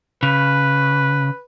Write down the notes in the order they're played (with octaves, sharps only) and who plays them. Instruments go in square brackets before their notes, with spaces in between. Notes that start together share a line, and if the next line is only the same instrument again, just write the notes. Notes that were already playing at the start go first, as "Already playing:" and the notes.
[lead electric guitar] C#3 [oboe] B4